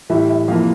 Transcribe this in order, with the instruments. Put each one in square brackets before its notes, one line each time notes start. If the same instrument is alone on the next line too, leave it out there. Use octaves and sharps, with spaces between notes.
[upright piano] A2 E3 G3 E5
E5
F2 C3 E3 A#3 F5